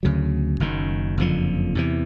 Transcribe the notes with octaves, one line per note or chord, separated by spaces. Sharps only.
D2 C#3 F#3
F#1 F#2 D#3
F#1 F2 D3 F3
E2 C3 E3